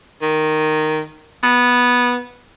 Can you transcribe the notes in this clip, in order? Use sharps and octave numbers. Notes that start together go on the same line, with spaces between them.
D#3
B3